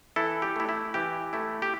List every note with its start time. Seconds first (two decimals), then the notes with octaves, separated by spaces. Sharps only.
0.16 E3 E4 A4
0.42 G4
0.56 A3 E4
0.69 E4
0.94 E3 G4
1.33 A3 E4
1.62 G4